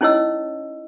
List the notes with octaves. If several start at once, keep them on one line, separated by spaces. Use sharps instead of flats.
C#4 D#4 E4 C#5 D#5 E6